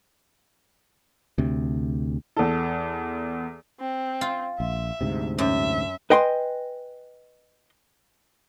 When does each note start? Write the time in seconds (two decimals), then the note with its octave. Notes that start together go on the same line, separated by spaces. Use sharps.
1.38 D2 C3
2.36 E2 A4
3.80 C4
4.21 F4
4.60 A#1 E5
5.01 D2 G#2 C3
5.38 F#2 E5
6.10 B4 D#5 G5 G#5 C6